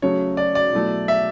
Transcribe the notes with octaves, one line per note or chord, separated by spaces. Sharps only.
C#3 F#3 A3 C#5
D5
D5
B2 F#3 A3 E4
E5